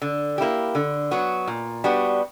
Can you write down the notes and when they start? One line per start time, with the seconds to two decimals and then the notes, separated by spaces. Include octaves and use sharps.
0.02 D3
0.38 A#3 E4 G4
0.75 D3
1.11 F#3 B3 F#4
1.48 A#2
1.84 G3 B3 D4 F#4